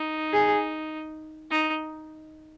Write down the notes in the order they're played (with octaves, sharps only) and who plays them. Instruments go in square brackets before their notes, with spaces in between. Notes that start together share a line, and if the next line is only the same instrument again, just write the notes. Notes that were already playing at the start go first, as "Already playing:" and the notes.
Already playing: [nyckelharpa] D#4
[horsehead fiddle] G#4
[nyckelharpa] D#4